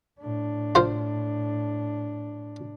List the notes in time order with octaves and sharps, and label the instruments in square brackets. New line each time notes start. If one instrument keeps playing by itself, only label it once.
[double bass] A2 D4
[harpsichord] F4 C5